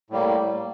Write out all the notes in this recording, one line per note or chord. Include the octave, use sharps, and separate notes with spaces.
A2 G3 A#3